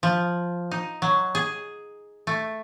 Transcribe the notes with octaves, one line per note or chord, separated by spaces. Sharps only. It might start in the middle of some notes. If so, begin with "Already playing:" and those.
F3
D#4
F#3
G#4
A3